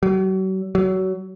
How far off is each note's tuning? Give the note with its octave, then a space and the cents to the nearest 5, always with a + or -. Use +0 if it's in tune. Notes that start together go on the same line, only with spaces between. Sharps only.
F#3 +40
F#3 +25